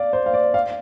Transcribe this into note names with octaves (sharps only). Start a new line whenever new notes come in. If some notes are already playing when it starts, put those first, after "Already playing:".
Already playing: D5 F5
C5
F5
D5
F5